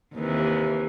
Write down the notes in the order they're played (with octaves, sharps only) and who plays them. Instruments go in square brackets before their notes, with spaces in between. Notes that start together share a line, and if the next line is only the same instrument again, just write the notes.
[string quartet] D#2 C3 E3